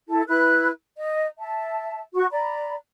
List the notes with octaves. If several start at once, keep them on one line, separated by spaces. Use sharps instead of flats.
E4 A4 A5
E4 B4 B5 F#6
D#5
E5 A5
F#4 C#6
D5 A#5 B5